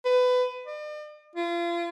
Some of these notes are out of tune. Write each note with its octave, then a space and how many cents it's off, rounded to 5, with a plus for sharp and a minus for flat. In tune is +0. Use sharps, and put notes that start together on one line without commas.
B4 +20
D5 +45
F4 -30